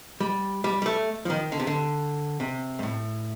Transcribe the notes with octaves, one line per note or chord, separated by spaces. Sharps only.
G3
G3
G3
A3
F3
D#3
D3
C3
D3
C3
G2
A2